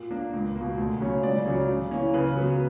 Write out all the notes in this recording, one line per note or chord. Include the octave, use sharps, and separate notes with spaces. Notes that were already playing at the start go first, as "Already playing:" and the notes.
Already playing: A#2
A#3 D4
C#2
B2 A#3
D2
C#3 F#3 A#3 C#4
C#2 D5
C#3 F#3 C#4
C#3
E3 A#3 C#4
C#3 B4
F#3 B3